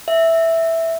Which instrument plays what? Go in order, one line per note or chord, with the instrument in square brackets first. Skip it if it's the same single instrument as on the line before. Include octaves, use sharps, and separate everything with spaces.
[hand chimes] E5